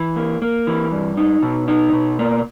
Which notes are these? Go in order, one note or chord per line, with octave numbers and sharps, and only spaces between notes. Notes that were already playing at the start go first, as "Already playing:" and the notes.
Already playing: E3
A#3
A#3
E3
G2
D#4
B2
D#4
B2
A#3